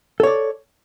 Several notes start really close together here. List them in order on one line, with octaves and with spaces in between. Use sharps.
A4 C#5 D5